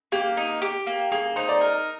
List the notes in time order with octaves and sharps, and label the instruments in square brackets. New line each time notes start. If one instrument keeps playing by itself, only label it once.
[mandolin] A#3 [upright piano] G4
[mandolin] D#4
G4
A#3
[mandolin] A#3 [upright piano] G#4
[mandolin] D#4 [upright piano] C5
[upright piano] D5
[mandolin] A#4